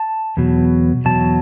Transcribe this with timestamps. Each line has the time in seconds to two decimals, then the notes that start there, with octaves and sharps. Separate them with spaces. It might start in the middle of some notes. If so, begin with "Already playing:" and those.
Already playing: A5
0.37 E2 B2 F#3
1.05 E2 B2 F#3 A5